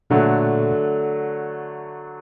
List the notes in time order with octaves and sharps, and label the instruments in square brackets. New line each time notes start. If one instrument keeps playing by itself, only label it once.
[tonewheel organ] A#2 [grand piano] D3 F#3 A3